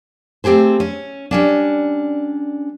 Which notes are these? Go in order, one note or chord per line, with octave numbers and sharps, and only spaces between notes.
A3 C4 G4 G#4 C5
C#4
G3 C#4 D4